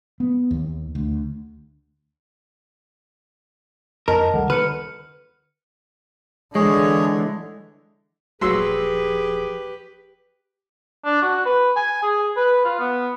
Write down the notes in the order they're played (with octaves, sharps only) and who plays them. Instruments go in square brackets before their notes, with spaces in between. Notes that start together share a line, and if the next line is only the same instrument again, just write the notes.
[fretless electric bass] B3
D#2
D2
[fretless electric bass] F2 [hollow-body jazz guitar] A#4 [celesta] D#5 A5
[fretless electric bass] C#2 D#3 G3 [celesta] A4 F#5
[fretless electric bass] D3 [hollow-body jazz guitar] B4 [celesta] F6 C#7
[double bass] D3 E3 [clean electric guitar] G#3 [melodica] G#4 C#5
[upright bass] D#1 F3 [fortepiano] F#3 C6 E6 [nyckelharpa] G4 B4 [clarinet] G#4
[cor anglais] D4
F#4
B4
G#5
G#4
B4
F4
B3